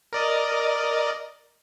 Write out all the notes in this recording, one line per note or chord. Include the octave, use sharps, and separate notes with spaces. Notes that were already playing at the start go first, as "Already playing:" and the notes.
A#4 D5 D#5